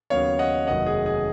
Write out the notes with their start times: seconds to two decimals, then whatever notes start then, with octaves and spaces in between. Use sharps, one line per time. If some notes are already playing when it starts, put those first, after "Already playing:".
0.10 D#2 C#3 F#3 B3 C#5 F5
0.39 D#5 F#5
0.67 F1 D#2 D#3 F#3 B3 D#5 F#5
0.86 G#4
1.06 G#4